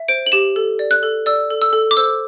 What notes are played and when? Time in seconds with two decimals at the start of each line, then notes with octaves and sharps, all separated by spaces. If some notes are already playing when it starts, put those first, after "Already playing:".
Already playing: E5
0.08 C5 D7
0.26 F#7
0.32 G4 E7
0.56 A4
0.79 D5
0.91 F#6
1.03 A4
1.26 D5 E6
1.50 A4
1.62 E6
1.73 A4
1.91 D6
1.97 C5 E6